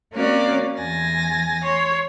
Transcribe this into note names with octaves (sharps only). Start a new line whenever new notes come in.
A#3 C4 C#4 F#4 C#5 D5
E2 G#5 A6 A#6
C#5 C6